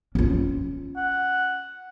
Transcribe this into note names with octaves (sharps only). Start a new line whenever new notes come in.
C#4 F4
F#5